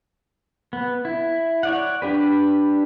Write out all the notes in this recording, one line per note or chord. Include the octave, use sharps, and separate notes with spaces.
B3
E4
C#5 D5 F#5
D4 G4 B4